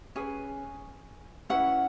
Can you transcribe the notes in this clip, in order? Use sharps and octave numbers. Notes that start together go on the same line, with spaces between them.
C#4 G#4 B4 G#5
C#4 E4 B4 F#5